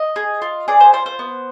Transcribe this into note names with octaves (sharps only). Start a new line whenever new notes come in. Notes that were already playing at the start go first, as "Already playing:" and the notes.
Already playing: D#5
G#4
F4
G#4 D5
C5
F4 C5
C5
B3